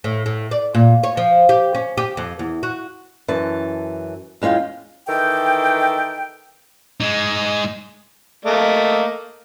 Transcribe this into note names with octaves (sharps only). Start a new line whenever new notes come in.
A2
A2
D5
A#2
C#5
F3
G4
C#4
G4
F2
E2
F#4
F#2 E3 A5
E2 G#3 C#4 F4 G5
D#3 E3 A4 G5
G#3 D#4
A3 A#3 D#5